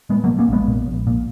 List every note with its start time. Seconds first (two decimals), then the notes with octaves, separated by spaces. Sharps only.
0.10 A#2 G#3 B3
0.24 F#3 A#3
0.29 A#2
0.39 A#3 C#4
0.49 A#1 G#3 B3
0.68 A#2
0.87 A#1
1.07 A#2